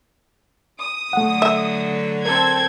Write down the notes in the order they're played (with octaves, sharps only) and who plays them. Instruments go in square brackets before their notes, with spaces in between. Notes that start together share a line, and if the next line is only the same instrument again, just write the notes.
[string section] D#6
[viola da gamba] D3 F#3 [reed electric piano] A3 F#5
[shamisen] E5
[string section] C4 A4 G#6 [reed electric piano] A#4